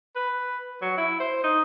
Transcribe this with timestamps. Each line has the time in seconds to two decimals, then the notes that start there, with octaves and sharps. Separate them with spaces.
0.16 B4
0.82 F#3
0.97 E4
1.20 C5
1.44 D#4